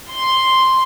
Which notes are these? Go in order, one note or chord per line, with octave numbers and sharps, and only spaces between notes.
C6